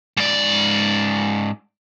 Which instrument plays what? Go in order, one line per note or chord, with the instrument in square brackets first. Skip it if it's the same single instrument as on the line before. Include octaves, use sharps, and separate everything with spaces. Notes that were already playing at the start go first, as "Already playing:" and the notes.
[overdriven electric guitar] G#2 D5